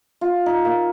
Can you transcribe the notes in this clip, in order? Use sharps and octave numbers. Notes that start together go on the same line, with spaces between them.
F4
D#4
A#3